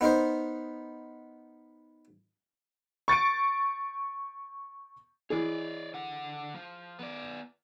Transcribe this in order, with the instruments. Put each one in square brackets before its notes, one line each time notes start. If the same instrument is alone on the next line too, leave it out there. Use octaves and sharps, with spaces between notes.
[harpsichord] B3 D#4 A#4 C5
[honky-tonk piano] C#6 A6 C#7 D7
[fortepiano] E3 G#4 [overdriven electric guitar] C#5 D5
[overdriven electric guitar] D3 F#5
F3
B3 D5